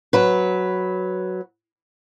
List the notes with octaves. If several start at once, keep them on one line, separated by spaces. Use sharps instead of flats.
F#3 B4